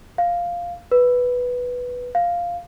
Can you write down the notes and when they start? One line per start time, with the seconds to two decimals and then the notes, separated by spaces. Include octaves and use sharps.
0.18 F5
0.92 B4
2.15 F5